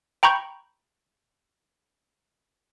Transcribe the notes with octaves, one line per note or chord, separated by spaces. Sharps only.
G5 A#5 B5 C#6 G6